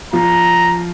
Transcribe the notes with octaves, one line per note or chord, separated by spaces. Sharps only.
F3 F4 A#5